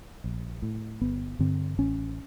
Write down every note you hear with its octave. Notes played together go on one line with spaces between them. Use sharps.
A#1
A2
G1 B3
G2 D3 C4
A1 C#4